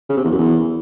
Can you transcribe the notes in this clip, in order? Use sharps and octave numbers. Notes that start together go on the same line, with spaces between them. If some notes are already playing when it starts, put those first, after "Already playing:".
C#3
C3
E2
F#2
E2